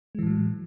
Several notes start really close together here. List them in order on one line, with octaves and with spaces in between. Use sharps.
G#3 E3 A2 F#3